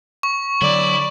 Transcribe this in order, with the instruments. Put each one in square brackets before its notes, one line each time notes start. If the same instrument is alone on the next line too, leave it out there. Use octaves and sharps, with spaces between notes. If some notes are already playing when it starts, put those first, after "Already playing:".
[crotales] C#6
[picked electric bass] D3 F#3 [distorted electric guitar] E4 [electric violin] D5 B5